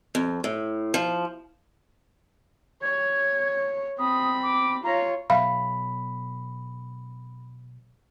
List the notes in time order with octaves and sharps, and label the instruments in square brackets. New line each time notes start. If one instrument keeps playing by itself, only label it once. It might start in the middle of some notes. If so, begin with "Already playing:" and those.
[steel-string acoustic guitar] F2
A2
F3
[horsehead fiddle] C#5 [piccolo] G#6
[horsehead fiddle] C4 B5 [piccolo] D#6
[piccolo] D6
[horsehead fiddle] F4 C#5 [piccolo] A#5
[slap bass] B2 F#3 [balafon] E5 F5 [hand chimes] B5